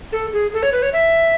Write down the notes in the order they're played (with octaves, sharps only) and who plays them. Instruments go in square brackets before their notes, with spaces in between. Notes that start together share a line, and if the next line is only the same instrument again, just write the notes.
[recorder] A4
G#4
A4
C#5
B4
C#5
E5